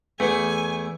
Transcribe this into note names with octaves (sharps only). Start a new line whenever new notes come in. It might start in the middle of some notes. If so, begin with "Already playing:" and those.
E2 A3 G#5